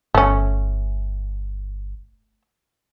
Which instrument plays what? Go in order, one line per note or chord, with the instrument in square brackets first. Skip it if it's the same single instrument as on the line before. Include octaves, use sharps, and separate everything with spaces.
[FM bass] G1 [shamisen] A3 C#4